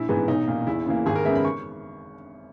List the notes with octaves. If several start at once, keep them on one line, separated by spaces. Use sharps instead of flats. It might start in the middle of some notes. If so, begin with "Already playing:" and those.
Already playing: A#1 E4
G#2 E3 G#3 B3
B1 D#4
A#2 A#3
E2 E4
C#3 E3 A#3
G#1 G#4
A#4
F#2 C#3 G#3 B3 E5
B5
C#6